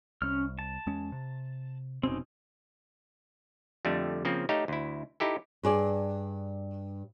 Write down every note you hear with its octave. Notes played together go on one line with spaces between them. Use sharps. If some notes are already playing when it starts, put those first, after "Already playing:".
C2 C#4 F6
A5
E2 G#3 C#4
C3
F1 B2 C4 C#4 D#4
F2 D3 G3 A3
C#3 F3 A#3 C4
A3 D#4 G4 C#5 F5
D2 E4
D#4 E4 G4 A4
G2 G#4 D5